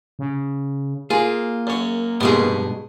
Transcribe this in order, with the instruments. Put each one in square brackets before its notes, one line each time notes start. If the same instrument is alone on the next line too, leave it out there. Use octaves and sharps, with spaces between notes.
[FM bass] C#3
[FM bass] A#3 [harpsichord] F4 [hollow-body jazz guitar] G#4
[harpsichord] F#2 C#5
[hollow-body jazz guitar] G2 B2 G#3 [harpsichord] B3 G#4